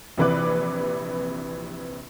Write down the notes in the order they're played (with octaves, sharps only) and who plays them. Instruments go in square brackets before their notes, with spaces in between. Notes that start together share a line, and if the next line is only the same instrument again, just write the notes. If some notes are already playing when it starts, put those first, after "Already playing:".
[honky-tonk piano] A#1 C3 E3 B4 D6 F#6